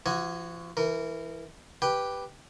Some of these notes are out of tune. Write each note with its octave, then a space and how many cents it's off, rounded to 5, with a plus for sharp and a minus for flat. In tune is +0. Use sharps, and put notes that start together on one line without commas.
F3 -40 F#4 +0 G#5 +0
E3 +0 A#4 -25
G4 +0 B4 +0 G5 +0